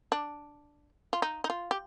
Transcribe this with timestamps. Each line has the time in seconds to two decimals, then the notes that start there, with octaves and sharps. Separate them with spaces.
0.12 D4
1.13 F4
1.22 D#4
1.44 D#4
1.50 F4
1.71 G4